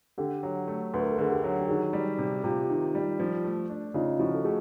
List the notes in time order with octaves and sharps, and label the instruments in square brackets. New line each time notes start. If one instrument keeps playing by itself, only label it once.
[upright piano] D3 [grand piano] G4 A4
[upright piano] F#3
A3
[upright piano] D2 [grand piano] B4
[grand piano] A#4
A4
[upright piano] D3 [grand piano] G#4 A#4
[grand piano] G4 A4
[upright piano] F#3
[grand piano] G4
[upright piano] D#3 [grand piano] F#4 G#4
[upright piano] G3
C3
[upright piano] C3 [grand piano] F4 G4
[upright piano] D#3
G3
F3
A3
D4
[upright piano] C#3 [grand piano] D#4 F4
[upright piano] F3 [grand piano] E4 F#4
[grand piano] A4
[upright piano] A3 [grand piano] F#4 G#4